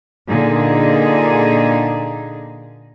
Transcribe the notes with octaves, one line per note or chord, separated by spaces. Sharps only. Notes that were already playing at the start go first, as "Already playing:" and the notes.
A#2 D3 D#4 G#4